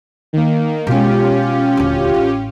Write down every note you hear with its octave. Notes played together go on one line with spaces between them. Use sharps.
D#3 A#3
B2 G#3 C#4 F4 G4
D#1 D2
A1